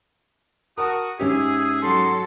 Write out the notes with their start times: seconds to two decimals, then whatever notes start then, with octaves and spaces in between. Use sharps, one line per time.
0.78 F#4 A#4 A5 D#6
1.20 G#2 C#4 G4 G#4 E5
1.82 F#3 A4 C6